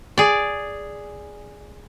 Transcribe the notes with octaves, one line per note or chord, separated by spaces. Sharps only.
G#4 D5